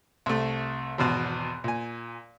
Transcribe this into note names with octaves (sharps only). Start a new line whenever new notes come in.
C2 A3
G#1 E2 B2 A5
A#2 G#5